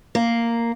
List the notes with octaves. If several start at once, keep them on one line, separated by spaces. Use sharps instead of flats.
A#3